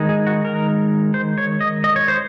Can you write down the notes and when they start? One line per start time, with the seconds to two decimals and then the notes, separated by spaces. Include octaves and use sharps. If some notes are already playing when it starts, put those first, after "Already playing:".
Already playing: D#3 G#3 D#4
0.09 G#4
0.27 F#4
0.45 A#4
1.14 C5
1.38 C#5
1.61 D#5
1.84 D#5
1.96 C#5
2.08 C5